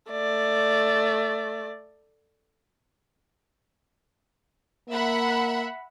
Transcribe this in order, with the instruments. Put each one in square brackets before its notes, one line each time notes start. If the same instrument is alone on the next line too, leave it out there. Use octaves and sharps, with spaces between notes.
[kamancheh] A3 D5
[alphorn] A#3 [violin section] E5 F#5 B5